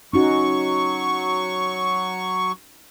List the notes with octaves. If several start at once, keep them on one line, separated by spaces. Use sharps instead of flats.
F#3 C#4 D#4 F#4 C#6